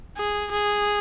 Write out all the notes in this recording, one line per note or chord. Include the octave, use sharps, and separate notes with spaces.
G#4
G#4